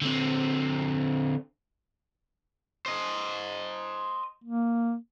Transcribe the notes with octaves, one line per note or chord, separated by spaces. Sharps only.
D3 C4
C5 D#5
A#3